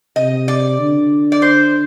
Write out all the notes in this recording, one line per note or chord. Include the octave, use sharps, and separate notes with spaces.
C3 D#5
D5
D3
D5
C5